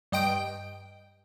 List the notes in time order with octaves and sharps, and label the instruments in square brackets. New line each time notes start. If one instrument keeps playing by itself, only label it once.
[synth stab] G2 D#5 G5 D7